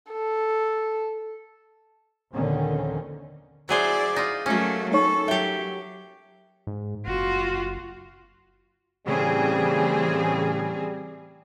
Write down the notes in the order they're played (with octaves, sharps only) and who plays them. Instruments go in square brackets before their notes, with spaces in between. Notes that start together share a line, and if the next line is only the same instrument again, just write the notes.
[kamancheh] A4
[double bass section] A#1 D#2 D3 D#3 C4 C#4
[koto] F#3 G#4 C5 [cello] E4 D5
[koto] D#4 F4
[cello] F#3 A3 [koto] A#3 C#4
[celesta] D#4 C#5 C#6 [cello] A4
[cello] F#3 [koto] G4 G5 [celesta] E5
[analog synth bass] G#2
[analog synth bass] F#1 [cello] F4 F#4
[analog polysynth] A2 C#3 [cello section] E3 C4 G#4 [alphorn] G3